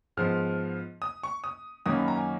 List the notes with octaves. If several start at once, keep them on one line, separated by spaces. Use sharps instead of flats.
G#2 F3 B3 F6
D#6
C#6
D#6
F#2 D#3 A#3 C#4 D#6
B5
A#5
G#5